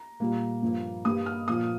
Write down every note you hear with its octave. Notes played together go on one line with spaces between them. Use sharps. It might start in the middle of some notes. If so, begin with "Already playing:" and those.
Already playing: A#5
A#2 G3 A#3
G2 F3 A#3
G2 G3 A#3 D#6
F6
A#2 F3 A#3 D#6